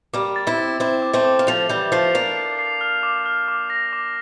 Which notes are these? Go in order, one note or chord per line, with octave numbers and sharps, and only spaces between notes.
G3 A#3 D6
A6
C4 E4
A6
C4 E4 A6
D6
A3 C4
D6
A#3
F3 A3 F7
E3 G3 G6
F3 A3 C7
A#3 D4 F7
C7
C7
F6
D6
F6
D6
A#6
D6